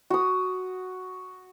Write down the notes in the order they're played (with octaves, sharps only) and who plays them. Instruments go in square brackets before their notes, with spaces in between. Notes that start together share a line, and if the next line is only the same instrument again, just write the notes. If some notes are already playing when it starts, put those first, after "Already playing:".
[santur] F#4 D#6